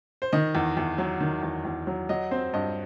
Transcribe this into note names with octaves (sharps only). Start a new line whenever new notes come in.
C5
D#3 D#5
E2
E2
F#3
D#3
E2
E2
F#3
F#3 D#5
C4 C5
G2 D#5